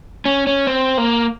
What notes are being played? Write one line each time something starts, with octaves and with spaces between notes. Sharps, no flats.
C#4
C#4
C4
A#3